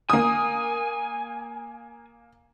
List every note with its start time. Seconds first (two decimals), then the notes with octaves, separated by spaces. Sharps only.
0.10 A#3 G#5 D#6